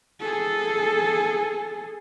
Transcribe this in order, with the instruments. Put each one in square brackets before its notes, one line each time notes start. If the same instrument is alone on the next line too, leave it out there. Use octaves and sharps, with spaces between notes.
[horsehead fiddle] G#4 A4